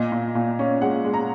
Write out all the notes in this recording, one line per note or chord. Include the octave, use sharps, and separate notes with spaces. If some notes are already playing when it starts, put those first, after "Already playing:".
Already playing: A#2 D#5
A#2
A#2
C#4
G#3 F#5
G#3
A#5